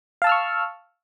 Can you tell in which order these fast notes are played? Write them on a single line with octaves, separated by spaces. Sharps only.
F5 A5 E6 F6 C#6